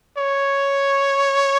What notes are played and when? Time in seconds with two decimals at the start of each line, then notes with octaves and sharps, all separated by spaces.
0.17 C#5